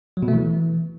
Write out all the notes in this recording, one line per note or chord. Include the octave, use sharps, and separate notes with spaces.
F#3
B2
A3
E3